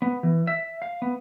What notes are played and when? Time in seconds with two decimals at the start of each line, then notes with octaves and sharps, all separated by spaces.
0.02 B3
0.23 E3
0.47 E5
0.82 F5
1.02 B3